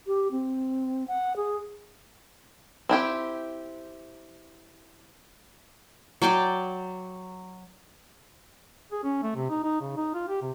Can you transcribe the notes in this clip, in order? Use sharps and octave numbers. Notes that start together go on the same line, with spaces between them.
G4
C4
F#5
G#4
C4 E4 G4
F#3 D5 G5 D6
G#4
C#4
A3
C3
D#4
D#4
C#3
D#4
F4
G4
C3